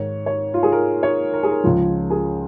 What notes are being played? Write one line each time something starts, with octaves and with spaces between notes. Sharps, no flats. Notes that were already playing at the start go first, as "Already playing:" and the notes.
Already playing: G#2 D#3 C#5
C#5
F4
G#4
A#4
C#5
A#4
G#4
A#4
C#2 C#3 F3 F4
G#4